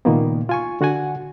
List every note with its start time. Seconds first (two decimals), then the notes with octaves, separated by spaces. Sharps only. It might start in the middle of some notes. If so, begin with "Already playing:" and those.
0.05 C#2 A#2 D#3 A#3 B3
0.49 F4 G#5 C#6
0.81 D3 F#4 F#5 G#5